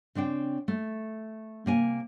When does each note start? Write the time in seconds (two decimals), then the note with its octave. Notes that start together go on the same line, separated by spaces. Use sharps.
0.15 C#3 C4 D4 G5
0.68 A3
1.66 C3 A#3 G#5